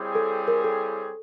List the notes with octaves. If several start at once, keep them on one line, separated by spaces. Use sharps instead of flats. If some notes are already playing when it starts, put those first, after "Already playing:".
Already playing: G3 C4 E4 G#4 C#5
A4
A#4
A4